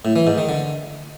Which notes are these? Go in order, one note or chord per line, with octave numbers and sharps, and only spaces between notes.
A2
E3
G#2
D#3
D3